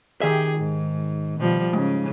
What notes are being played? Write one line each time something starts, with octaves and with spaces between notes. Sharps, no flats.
D#3 G4 G#4 E5
G#2
B2 F3 G3
G#2 C#3